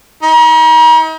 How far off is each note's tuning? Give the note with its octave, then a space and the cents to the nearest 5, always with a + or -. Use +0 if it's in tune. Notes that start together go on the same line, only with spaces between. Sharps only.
D#4 +40